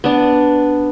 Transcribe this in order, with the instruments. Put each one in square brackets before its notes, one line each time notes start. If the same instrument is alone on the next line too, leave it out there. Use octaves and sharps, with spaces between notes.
[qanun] B3 D4